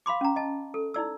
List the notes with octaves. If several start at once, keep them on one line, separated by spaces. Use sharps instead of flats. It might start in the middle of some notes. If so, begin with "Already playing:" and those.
F5 B5 C6 D6
C#4 A#5
D#5 A5
A4
D#4 E4 D5 E6